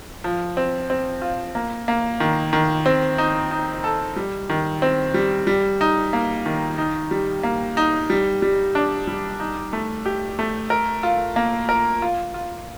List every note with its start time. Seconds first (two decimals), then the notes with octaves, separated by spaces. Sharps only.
0.24 F3
0.57 C4
0.90 C4
1.22 F4
1.55 A#3
1.88 A#3
2.20 D#3
2.53 D#3
2.86 C4
3.18 D#4
3.51 D#4
3.84 A4
4.16 G3
4.50 D#3
4.82 C4
5.14 G3
5.47 G3
5.81 D#4
6.13 A#3
6.46 D#3
6.78 D#4
7.11 G3
7.43 A#3
7.77 D#4
8.10 G3
8.42 G3
8.75 D4
9.07 G3
9.40 D#4
9.73 A3
10.06 G4
10.39 A3
10.70 A#4
11.03 F4
11.36 A#3
11.69 A#4
12.02 F4
12.34 F4